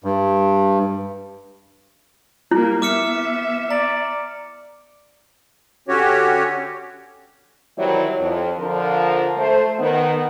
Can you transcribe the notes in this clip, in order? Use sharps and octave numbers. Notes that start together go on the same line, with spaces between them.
G2
G3 A#3 E4
B3 E5 D6 F6 C#7
D5 A#5
D3 C#4 F#4 G4 C#5
D#3 E3 F#3 G3 C4 E4
F2
D3 F3 A#4
A3 C5
D#3 B3